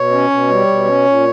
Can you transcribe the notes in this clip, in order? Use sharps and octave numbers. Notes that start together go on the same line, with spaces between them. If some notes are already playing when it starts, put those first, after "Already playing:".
Already playing: B2 C#5
C#4
B2
G3
B2
C#4
A#2